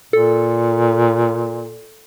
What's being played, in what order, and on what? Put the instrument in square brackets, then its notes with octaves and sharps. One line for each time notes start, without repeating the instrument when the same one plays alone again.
[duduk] A#2 [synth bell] A4